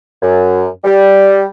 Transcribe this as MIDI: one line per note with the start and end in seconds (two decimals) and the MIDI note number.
0.22 0.66 42
0.84 1.46 55